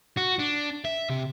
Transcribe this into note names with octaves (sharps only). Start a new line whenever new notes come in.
F#4
D4
E5
C3